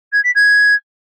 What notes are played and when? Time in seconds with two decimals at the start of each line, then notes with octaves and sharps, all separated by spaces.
0.12 G#6
0.23 B6
0.35 G#6